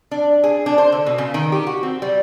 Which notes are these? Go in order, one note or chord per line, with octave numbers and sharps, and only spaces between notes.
D4
G#4
D4
C5
D3
B2
C#3
D#3
G4
F#4
C4
G3